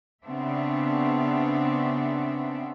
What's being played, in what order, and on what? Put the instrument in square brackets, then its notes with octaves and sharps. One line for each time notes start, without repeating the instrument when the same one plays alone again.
[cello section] C#3 B3 C4 D4 E5